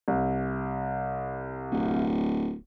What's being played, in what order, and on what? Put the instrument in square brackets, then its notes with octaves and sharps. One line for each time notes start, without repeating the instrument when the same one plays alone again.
[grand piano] C2
[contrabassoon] D1